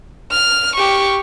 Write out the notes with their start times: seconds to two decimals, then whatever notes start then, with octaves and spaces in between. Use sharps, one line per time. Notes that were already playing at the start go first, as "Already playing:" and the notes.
0.32 F6
0.76 G4 C#6